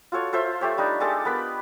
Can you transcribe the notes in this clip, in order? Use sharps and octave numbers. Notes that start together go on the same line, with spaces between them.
F4 F#4 A4 C#5
F4 A4 C5 E5
A3 G4 C#5
G3 D4 D#4
G#3 G4 A4 A5
B3 A#4 B4 B5